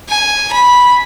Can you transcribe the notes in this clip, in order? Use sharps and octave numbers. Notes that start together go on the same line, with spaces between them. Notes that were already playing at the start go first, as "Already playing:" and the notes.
G#5
B5